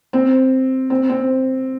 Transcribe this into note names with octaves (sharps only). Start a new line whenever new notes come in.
C4
C4
C4